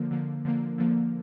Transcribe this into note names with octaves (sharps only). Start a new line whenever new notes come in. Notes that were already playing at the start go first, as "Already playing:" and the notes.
Already playing: D3 F3 A#3
D3 F3 A#3
D3 F3 A#3
D3 F3 A#3